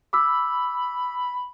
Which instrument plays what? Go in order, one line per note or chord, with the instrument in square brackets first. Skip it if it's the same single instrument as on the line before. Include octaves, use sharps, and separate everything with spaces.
[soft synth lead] B5 [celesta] D6 E6